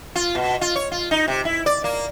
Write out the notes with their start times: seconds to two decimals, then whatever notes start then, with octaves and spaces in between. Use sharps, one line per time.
0.15 F4
0.35 B2
0.61 F4
0.76 C#5
0.92 F4
1.11 D#4
1.28 C3
1.45 E4
1.66 D5
1.84 A#3